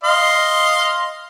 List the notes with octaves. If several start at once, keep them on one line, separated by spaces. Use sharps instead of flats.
D#5 F5 C6